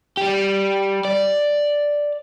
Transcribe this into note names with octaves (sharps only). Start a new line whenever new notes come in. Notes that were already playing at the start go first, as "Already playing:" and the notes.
G3 G4
D5